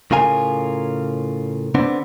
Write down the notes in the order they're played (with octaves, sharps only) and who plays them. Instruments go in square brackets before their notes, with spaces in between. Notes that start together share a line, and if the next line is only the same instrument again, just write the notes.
[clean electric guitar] A2 C#3 F4 A#4 G#5
D3 B3 C4 D4